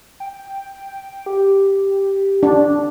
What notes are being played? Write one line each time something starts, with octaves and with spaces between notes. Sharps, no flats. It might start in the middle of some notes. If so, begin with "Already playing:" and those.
G5
G4
D4